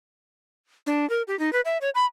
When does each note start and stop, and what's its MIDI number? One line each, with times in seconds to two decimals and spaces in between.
0.87 1.08 62
1.10 1.22 70
1.28 1.38 67
1.39 1.53 63
1.53 1.61 71
1.65 1.78 76
1.81 1.90 73
1.95 2.05 83